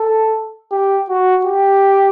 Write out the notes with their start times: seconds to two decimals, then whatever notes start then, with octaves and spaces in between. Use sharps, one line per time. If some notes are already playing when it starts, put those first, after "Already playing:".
Already playing: A4
0.71 G4
1.09 F#4
1.45 G4